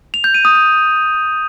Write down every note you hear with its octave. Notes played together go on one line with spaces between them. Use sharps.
F7
G6
D#7
D#6
G6